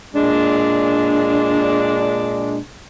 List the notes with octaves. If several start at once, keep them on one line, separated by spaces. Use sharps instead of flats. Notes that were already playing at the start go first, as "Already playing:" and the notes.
A#2 G#3 D4